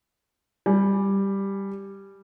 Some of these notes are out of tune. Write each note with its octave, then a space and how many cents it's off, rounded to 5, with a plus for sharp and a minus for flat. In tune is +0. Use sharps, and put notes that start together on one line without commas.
G3 +5 G#5 +0